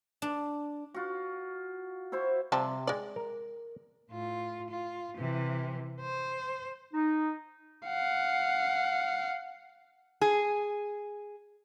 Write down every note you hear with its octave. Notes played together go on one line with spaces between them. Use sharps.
D4
F4 F#4
E4 F#4 C5 E5
C3 F3 G3 A5
G#3 D5
A#4
A2 F4
F4
C3 E3
C5
D#4
F5 F#5
G#4